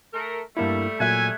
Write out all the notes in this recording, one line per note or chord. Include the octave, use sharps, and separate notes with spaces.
A3 A4 A#4
G2 G3 A3 A#3 E4
A#2 F#3 E5 G#5 F#6 G#6